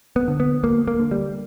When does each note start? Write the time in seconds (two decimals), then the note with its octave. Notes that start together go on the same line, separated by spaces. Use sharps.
0.16 B3
0.28 D3
0.40 B3
0.63 D2 A#3
0.88 A#3
1.00 D3
1.11 G3